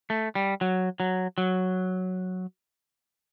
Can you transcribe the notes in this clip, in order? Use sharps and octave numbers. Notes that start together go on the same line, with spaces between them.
A3
G3
F#3
F#3
F#3